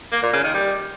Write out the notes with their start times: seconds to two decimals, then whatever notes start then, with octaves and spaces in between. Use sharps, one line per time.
0.12 A#3
0.23 A#2
0.33 C#3
0.44 D#3
0.54 G3